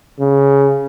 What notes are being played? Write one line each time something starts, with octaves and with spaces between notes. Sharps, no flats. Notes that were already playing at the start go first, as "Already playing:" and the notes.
C#3